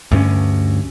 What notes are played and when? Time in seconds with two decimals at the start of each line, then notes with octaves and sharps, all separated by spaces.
0.11 D2 G2 C4 C#4